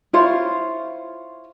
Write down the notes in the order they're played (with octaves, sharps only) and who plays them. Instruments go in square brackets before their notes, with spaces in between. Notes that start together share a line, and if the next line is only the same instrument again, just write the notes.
[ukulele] E4 F4 C5 C#5